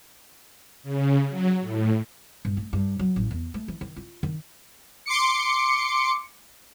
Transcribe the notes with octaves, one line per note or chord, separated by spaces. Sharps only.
C#3
F#3
A2
G2
A3
G2
F#3
A1
E2
A3
E3
D#3
F4
D#3
C6 D6 C#7